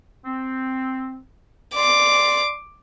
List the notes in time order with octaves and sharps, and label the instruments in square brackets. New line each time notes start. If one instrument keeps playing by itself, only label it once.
[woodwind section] C4
[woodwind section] D5 C6 [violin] D6